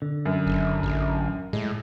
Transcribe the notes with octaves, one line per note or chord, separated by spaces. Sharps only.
D3
F#2
F#1
A1
A2 G#3